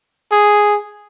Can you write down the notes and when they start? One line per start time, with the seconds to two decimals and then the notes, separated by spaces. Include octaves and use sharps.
0.32 G#4